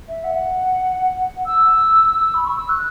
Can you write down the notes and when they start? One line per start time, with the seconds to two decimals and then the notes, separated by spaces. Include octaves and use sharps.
0.08 E5
0.24 F#5
1.46 E6
2.34 B5
2.45 C#6
2.57 E6
2.69 F#6